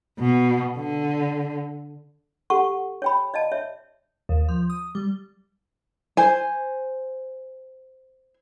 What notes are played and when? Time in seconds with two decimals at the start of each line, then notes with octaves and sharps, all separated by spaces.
0.19 B2
0.78 D3
2.50 G4 A4 F#5 C#6
3.02 C#5 G5 B5
3.34 D5 D#5 F5 A5
3.52 C#5 E5
4.29 D#2
4.48 F3
4.70 D#6
4.95 G3
6.17 C5 G#5